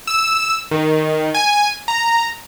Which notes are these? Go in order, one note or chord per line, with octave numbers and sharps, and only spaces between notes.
E6
D#3
G#5
A#5